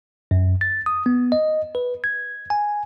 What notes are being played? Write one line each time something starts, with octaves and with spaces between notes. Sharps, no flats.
F#2
A6
D#6
B3
D#5
B4
G#6
G#5